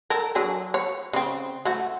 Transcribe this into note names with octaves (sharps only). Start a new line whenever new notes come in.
A4 A#4
F#3 D4 G#4
C#5
C#3 C4
A3 F#4